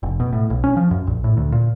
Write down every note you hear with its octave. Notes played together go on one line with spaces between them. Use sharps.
F1
B2
A2
B1
C#4
F3
F#2
A#1
A2
D2
A#2